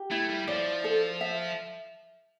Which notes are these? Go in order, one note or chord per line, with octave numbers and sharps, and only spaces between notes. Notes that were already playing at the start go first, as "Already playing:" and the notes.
Already playing: G4
A3 E4
G3
F3 D5
A4
E5